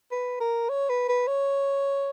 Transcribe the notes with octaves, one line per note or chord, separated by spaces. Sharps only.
B4
A#4
C#5
B4
B4
C#5